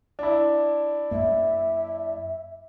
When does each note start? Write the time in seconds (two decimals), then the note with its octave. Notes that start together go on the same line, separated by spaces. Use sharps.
0.19 D4 E4
1.11 F#2 A#3 E5